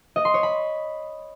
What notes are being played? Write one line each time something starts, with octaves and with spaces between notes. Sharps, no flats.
D#5
C6
C#5
B5